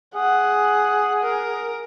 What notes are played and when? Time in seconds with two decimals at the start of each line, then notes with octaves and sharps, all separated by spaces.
0.15 G#4 F#5
1.23 A#4